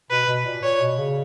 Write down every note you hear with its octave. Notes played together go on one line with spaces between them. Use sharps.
B2 B4
B2
A#2
A#2 C#5
B2
C#3